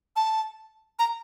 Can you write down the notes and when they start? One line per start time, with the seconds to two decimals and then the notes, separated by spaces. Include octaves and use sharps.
0.16 A5
0.99 A#5